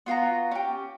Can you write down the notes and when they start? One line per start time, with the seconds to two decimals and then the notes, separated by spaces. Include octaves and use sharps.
0.06 B3 F4 F#4 A#5
0.51 C#4 G4